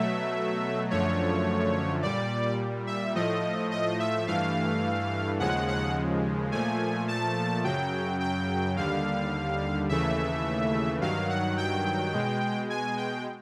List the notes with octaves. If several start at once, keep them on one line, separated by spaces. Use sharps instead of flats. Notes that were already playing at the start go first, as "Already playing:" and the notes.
Already playing: B2 F#3 A3 E5
F#2 D3 F3 A3 C#5
A#2 G3 D5
E5
A2 F3 A3 D#5
D#5
E5
G2 E3 A3 F5
D#2 C#3 F3 G#3 F#5
F#5
A#2 F3 A3 G#5
A5
F#2 C#3 F#3 G5
G5
D#2 D3 G3 F5
D#2 C#3 E3 A3 E5
G2 D#3 F#3 F5
F#5
G5
B2 G#3
G#5
G5